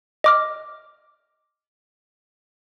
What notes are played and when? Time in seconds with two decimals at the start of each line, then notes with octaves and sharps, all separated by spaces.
0.24 D#5 D6 F6